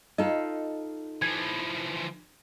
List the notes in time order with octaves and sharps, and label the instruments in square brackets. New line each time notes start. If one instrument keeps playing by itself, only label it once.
[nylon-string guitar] D#4 F4 A4 [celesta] D#5
[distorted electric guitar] E3 F3 [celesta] G#6